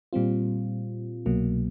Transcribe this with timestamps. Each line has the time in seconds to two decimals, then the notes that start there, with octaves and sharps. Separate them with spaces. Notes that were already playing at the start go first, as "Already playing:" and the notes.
0.13 A#2 G3 C4 F4
1.26 C2 B2 F#3 A#3